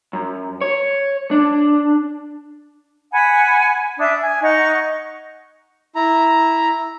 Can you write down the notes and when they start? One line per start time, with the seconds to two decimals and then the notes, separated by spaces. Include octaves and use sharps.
0.13 F#2
0.61 C#5
1.31 D4
3.12 F#5 G#5 B5
3.99 D4 E5 D#6
4.21 G#5
4.42 D#4 F#5 C#6
5.95 E4 A#5